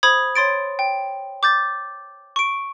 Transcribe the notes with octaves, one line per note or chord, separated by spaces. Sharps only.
C5 B5 D#6 G#6
C#5 C6 A6 D7
G5
D6 G6 A6
C#6 D7